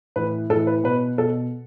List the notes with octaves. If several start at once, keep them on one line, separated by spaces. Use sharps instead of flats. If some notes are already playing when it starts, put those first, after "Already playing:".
A2 E3 B4
A2 E3 A4
B4
B2 B4
B2 A4